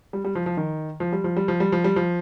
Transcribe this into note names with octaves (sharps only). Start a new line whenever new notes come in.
G3
G3
F3
F3
D#3
F3
G3
F3
G3
F3
G3
F3
G3
F3